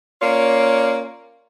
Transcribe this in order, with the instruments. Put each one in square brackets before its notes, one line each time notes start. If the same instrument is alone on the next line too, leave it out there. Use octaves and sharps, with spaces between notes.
[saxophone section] A#3 C#4 F4 C#5 D5